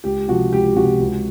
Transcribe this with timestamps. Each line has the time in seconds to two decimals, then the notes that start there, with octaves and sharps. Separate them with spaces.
0.04 C#2 G4
0.28 C3 F3 F#4
0.52 C#2 G4
0.76 C3 F3 F#4
1.00 C#2